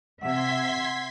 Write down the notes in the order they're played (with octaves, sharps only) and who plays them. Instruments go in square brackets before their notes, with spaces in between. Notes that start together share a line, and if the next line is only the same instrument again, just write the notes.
[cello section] C3 E5 [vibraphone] F#5 [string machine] C6 G#6 B6